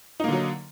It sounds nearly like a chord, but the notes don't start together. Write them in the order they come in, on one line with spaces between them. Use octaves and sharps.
D#4 A#3 D3 F#3